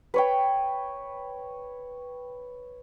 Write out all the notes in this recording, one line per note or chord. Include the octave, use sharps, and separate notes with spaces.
B4 C#5 G5